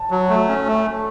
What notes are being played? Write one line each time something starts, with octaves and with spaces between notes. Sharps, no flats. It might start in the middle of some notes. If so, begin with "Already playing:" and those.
Already playing: A5
F#3
A3
C#4
A3